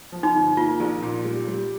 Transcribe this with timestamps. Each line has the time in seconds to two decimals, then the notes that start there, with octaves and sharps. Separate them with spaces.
0.12 F3
0.23 D#4
0.34 G1
0.57 A#3 F4
0.80 A#1
1.02 A#2
1.25 G3
1.48 G3